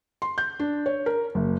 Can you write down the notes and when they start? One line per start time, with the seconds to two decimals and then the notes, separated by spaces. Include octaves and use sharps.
0.22 C6
0.38 G6
0.59 D4
0.86 C#5
1.06 A#4
1.35 F#1